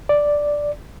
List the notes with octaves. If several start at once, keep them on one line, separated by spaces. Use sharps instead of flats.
D5